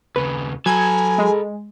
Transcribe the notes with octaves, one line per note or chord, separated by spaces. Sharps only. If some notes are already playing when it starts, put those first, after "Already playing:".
D#2 C#3 B4
F#3 A4 B4 G#5 G#6
G#3